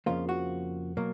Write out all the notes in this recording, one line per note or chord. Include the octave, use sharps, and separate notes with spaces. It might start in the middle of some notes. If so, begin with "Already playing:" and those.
F2 C#3 F3 A#3 F4
F#4
B2 F#3 A#3